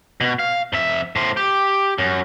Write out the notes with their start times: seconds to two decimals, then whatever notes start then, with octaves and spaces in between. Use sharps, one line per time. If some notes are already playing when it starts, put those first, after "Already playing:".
0.21 B2
0.39 F5
0.73 F2 E5
1.16 A2 C5
1.37 G4
1.98 F#2